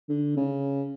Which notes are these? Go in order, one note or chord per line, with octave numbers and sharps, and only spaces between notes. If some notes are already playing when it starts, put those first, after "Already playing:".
D3
C#3